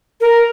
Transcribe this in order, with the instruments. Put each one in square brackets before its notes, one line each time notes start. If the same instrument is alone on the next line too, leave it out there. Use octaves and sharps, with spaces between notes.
[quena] A#4